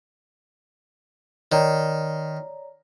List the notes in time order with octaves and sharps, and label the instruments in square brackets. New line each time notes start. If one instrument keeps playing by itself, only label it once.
[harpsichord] D#3 [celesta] C#5 D5 A#5